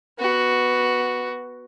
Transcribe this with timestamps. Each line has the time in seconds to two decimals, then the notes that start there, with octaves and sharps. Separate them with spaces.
0.19 B3 F#4